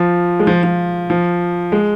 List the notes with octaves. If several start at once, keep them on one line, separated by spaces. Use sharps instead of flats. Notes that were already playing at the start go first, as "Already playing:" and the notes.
Already playing: F3
G#3
F3
F3
F3
G#3